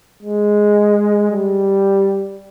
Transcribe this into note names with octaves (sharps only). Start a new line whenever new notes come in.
G#3
G3